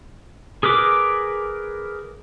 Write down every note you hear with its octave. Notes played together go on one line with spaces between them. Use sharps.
G#4 A#4 B4 D6